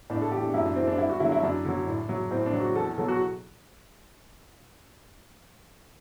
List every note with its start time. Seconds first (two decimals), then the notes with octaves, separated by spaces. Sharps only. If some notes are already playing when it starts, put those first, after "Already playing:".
0.10 A2 D4
0.22 A4
0.32 E3 G4
0.43 D4
0.54 F#2 E4
0.65 D4
0.76 E3 C4
0.87 D4
0.98 G2 E4
1.09 F#4
1.20 D3 E4
1.25 F#3
1.32 E4
1.43 F#2 D4
1.65 D3 F#3
1.88 A2
2.09 F#3
2.31 A2 C4
2.46 D4
2.53 F#3
2.61 F#4
2.76 E2 A4
2.97 B2 F#3 A4
3.08 F#4